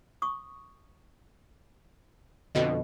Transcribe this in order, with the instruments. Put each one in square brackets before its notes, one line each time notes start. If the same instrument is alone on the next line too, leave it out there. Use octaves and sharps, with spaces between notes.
[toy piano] C#6 D#6
[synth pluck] F2 B2 D3 [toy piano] D#5 G5